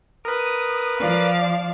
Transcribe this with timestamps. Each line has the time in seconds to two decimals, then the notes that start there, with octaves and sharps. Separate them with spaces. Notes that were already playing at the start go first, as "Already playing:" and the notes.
0.25 A#4 B4 D#6
1.00 F3 D5 F5